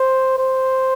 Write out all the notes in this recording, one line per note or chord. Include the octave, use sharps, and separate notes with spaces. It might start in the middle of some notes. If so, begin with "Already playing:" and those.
Already playing: C5
C5